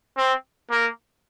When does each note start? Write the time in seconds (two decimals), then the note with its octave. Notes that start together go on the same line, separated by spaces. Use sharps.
0.17 C4
0.71 A#3